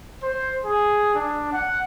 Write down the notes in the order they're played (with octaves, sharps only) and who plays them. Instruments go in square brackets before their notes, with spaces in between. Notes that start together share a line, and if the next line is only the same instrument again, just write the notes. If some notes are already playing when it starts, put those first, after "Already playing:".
[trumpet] C5
G#4
D4
F#5